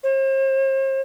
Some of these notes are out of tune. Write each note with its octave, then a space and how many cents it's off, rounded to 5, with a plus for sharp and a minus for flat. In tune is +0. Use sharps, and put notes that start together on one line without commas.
C5 +40